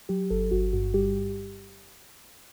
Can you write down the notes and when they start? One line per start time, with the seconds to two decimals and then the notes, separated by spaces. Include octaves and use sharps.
0.09 F#3 G4
0.30 G1 A4
0.51 G1 F#4
0.73 G2 F#4
0.94 G3 G4